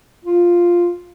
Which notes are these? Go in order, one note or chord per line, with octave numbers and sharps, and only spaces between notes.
F4